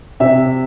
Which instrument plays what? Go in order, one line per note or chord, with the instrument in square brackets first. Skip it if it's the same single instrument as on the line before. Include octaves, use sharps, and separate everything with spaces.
[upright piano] C3 E5